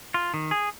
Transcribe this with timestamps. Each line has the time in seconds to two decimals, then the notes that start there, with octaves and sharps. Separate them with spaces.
0.14 F4
0.34 D#3
0.51 G#4